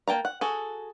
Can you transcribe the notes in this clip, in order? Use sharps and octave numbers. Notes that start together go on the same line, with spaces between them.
A#3 G5 A5 A#5
F#5
F#4 G#4 A4